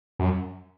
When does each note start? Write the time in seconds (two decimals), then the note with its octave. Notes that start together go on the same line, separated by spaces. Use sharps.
0.19 F#2